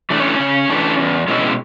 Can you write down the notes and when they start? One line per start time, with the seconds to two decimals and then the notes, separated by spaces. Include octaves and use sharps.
0.10 E3 A3 D4
0.20 C#4 C#5
0.39 C#3
0.70 E3 A3 D4
0.99 E2
1.28 B2 G#3 C#4 E4